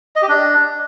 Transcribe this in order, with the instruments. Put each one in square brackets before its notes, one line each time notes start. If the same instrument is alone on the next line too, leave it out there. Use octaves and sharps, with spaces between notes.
[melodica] D#5
G4
D4